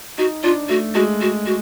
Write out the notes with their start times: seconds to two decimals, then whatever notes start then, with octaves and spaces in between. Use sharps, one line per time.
0.18 D#4 F#4
0.43 D4 F4
0.69 A3 F#4
0.95 G#3 F#4
1.21 F#4
1.46 F#4